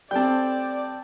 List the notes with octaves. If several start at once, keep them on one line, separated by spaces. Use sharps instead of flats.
G3 A3 C4 D5 G5 A5